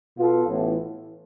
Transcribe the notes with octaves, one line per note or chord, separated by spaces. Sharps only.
B2 B3 F4 A4
A1 A2 E3 B3 E4